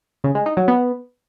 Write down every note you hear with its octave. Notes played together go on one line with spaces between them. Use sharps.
C#3
G#3
D#4
F#3
B3